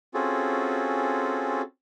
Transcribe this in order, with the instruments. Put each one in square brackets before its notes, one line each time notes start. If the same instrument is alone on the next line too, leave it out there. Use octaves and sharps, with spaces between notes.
[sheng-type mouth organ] C4 C#4 F4 F#4 G#4 A4